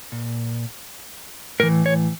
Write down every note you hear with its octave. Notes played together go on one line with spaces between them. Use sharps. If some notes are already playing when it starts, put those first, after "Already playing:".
A#2
A2 E3 A#4
C#5